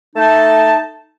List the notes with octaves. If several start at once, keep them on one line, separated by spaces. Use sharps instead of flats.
A3 D#4 A5